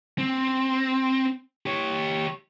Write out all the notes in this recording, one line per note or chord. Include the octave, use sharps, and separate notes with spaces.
C4
G4 C#5